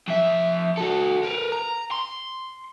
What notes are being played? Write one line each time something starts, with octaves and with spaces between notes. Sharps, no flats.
F2 E5
F#4 A4
A#4 B4
A#5
C6